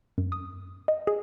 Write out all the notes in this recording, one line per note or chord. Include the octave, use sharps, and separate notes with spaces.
F#2
D#6
D#5
G#4